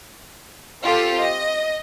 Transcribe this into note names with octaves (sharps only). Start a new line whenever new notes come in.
C4 F4 G4 A4
D#5